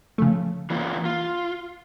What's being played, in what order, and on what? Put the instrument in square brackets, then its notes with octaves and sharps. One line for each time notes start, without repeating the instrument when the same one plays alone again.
[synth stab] C#3 F3 A3
[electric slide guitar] E3 A#3 F4
F4